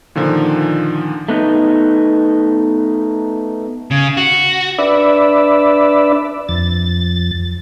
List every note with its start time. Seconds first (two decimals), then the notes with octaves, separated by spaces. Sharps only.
0.15 A#2 D3 D#3 F3
1.28 A3 B3 D#4
3.91 C#3
4.17 F#4
4.78 D4 B4 D5 E5
6.49 F2 A6